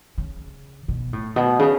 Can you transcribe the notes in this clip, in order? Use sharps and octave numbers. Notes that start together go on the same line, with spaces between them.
C#3
B2
A2
B2
C#3